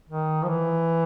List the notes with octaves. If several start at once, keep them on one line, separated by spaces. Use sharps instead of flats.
D#3
F3
E3